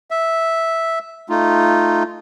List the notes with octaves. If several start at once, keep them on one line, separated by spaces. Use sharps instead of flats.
E5
A3 D#4 F4